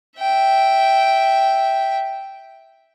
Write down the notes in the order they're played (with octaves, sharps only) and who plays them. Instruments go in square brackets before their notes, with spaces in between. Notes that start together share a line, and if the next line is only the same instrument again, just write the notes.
[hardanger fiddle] E5 G5